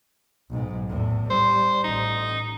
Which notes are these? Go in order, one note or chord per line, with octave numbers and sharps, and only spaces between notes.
B1 G#2
E2 A2
G3 C5
A1 D#4